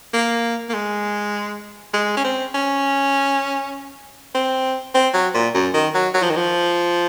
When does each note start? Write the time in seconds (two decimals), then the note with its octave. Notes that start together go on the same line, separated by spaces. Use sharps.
0.13 A#3
0.69 A#3
0.74 G#3
1.93 G#3
2.17 C#4
2.24 C4
2.54 C#4
4.35 C4
4.94 C4
5.14 F#3
5.34 A#2
5.55 F#2
5.74 D#3
5.94 F#3
6.14 F#3
6.22 F3
6.30 D#3
6.37 F3